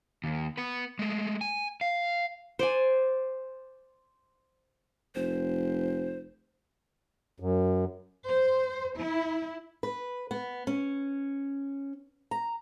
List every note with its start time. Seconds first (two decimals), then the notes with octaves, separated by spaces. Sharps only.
0.24 D#2
0.57 B3 B4
0.99 G#3 A3
1.41 G#5
1.81 F5
2.59 C5 D5 G#5
5.15 F1 C5
7.40 F#2
8.26 C5
8.98 E4
9.83 B4
10.31 B3
10.67 C#4
12.31 A#5